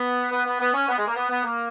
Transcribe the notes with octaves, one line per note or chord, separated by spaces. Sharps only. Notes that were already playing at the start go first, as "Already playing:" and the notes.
Already playing: B3
B3
B3
B3
C#4
B3
G#3
A#3
B3
B3
A#3